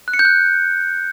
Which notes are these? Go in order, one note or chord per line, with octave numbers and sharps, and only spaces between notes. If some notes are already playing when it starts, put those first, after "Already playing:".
F#6
C#7
G6
F#6